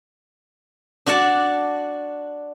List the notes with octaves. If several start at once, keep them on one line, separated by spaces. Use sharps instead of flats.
D4 F#4 D5 F#5 A5